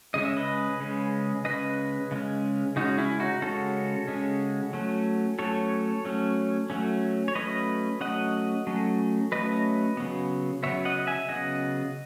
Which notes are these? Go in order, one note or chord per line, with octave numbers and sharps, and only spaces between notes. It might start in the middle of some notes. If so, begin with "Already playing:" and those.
C#3 G#3 C#4 D#5
E5
B4 D#5
C#3 G#3 C#4
C#3 G#3 C#4 B4 D#5
C#3 G#3 C#4
C#3 G#3 C#4 D#4 F#4
C#4 E4
D#4 F#4
C#3 G#3 C#4 F#4 A4
C#3 G#3 C#4
F#3 A3 C#4
F#3 A3 C#4 A4 C#5
F#3 A3 C#4
F#3 A3 C#4
C#5
F#3 A3 C#4 B4 D#5
F#3 A3 C#4 D#5 F#5
F#3 A3 C#4
F#3 A3 C#4 B4 D#5
C#3 F#3 B3
C#3 F#3 B3 C#5 E5
D#5 F#5
E5 G#5
C#3 F#3 B3 D#5 F#5